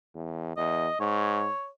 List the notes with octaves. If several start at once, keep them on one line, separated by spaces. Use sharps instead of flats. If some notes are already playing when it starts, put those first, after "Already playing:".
E2
E2 D#5
G#2 C#5